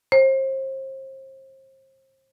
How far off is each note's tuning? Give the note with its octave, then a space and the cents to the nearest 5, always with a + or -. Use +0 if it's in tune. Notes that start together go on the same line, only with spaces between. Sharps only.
C5 +35